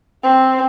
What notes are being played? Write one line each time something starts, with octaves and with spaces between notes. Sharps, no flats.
C4